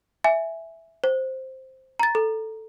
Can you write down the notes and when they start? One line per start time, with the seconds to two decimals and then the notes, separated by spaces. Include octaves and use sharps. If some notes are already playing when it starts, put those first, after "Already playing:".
0.24 E5 G#5
1.04 C5
2.00 A#5 A6
2.15 A4